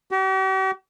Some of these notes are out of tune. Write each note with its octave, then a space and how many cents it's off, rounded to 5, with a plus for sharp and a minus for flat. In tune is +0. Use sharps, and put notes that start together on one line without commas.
G4 -45